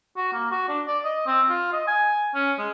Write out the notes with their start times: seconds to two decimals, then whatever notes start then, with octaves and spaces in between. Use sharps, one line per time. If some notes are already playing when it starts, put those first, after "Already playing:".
0.17 F#4
0.33 A#3
0.51 F#4
0.69 D4
0.87 D5
1.05 D#5
1.26 C4
1.49 F4
1.72 D#5
1.87 G#5
2.34 C#4
2.58 G#3